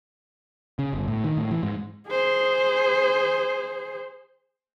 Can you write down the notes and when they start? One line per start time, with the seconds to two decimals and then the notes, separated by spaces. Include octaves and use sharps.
0.79 C#3
0.93 G1
1.08 A2
1.24 D#3
1.37 A2
1.51 E3
1.63 G#2
2.09 G#4 C5